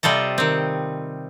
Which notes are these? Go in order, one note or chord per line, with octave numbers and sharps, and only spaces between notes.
C3 G3 F4 A4 D#5
D#3 C4